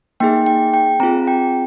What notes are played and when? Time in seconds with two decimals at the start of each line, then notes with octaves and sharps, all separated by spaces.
0.20 A#3 D#4 G#4 G5
0.46 G5
0.74 G5
1.00 C4 F4 G#4 A#5
1.27 G5